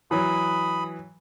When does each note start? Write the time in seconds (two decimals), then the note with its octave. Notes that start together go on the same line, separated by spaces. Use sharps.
0.11 E3 F#3 B5 D#6